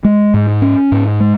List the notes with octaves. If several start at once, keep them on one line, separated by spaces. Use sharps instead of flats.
G#3
G#2
C#4
G#2
G#3